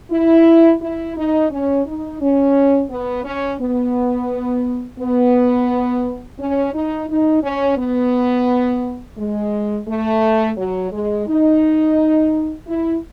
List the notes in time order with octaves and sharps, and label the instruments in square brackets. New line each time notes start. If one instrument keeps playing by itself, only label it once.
[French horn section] E4
E4
D#4
C#4
D#4
C#4
B3
C#4
B3
B3
C#4
D#4
D#4
C#4
B3
G#3
A3
F#3
G#3
D#4
E4